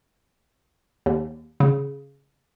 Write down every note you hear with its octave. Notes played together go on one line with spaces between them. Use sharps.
D#2
C#3